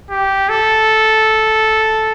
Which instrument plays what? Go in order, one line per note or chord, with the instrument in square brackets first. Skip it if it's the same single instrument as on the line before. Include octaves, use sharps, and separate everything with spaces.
[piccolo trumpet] G4
A4